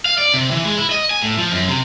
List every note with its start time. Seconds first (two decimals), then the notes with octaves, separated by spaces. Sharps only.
0.05 F5
0.18 D5
0.34 C3
0.51 E3
0.65 G#3
0.77 E4
0.91 D#5
1.11 G#5
1.23 A2
1.38 F3
1.52 F#2
1.68 C3